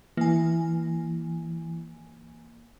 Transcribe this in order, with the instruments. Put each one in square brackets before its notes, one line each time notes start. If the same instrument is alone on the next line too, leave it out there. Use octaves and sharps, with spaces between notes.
[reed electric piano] E3 [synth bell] A#3 G#5